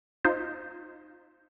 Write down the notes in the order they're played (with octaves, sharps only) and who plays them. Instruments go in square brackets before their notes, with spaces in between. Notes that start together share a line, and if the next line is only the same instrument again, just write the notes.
[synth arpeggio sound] D#4 F4 C5